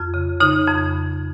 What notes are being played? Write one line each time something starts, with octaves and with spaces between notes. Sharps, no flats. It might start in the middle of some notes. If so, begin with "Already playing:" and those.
Already playing: F2 F4
C#3
C#3 D#4
F2